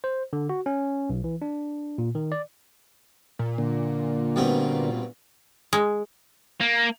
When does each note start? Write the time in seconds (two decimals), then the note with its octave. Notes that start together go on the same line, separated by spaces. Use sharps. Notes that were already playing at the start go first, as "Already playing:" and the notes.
0.04 C5
0.33 D3
0.49 F#4
0.66 C#4
1.10 B1
1.24 E3
1.42 D4
1.98 A#2
2.15 D#3
2.32 D5
3.39 A#2
3.58 D3 A#3
4.36 G2 B2 C4
5.73 G#3
6.61 A#3